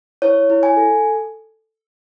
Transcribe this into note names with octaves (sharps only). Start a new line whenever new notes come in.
E4 C#5
E4
G#5
A4